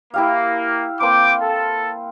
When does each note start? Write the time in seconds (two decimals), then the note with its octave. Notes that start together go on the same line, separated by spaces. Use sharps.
0.14 A#3 E4 G4 F5
1.00 A#3 C4 G5 C6 D6
1.41 A4